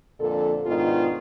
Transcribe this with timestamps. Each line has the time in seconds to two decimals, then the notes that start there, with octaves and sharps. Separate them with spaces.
0.20 F2 A#2 D3 A4
0.66 G#2 B2 D#3 B3 D4 F4